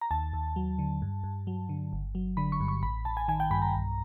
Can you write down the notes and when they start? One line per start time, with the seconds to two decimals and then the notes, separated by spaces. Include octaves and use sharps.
0.01 A#5
0.11 D#2 A5
0.33 D#2
0.56 F#3
0.79 D3
1.02 G2
1.24 G2
1.47 F#3
1.69 D3
1.93 G1
2.15 F#3
2.37 D3 B5
2.52 C#6
2.60 G2
2.68 C#6
2.83 A1 B5
3.05 A1 A5
3.17 G#5
3.28 D#3 G#5
3.40 G5
3.51 G2 B5
3.62 A#5
3.74 B1